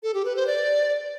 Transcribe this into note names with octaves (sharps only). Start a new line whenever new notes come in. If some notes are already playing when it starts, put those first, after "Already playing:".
A4
G4
B4
C5
D5